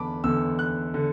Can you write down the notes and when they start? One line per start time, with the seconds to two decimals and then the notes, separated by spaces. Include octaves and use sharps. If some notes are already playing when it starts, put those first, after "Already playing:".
Already playing: E2 D3 A5 B5 D6
0.24 E2 D3 E6
0.59 F#6
0.94 D3